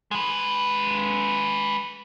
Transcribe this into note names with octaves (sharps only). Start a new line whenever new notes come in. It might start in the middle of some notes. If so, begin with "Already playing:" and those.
G#3 B4